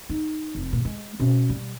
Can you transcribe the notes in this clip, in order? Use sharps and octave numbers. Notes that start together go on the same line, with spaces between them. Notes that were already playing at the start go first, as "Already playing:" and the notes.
D#4
F1
A#2
G#3
B2 C#4
G3